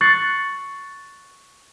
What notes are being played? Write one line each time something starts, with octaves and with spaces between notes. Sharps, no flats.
C#6 F#6 A6 C7 C#7